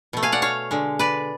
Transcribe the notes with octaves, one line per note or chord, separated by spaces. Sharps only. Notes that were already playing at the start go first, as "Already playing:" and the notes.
B2 A3
F5 G#5
D5 F#5
C#5 F5
D3 G#3
B4 D5